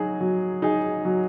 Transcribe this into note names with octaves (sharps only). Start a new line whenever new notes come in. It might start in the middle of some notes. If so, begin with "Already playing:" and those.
Already playing: F#3 D#4 G#4
F#3
D#4 G#4
F#3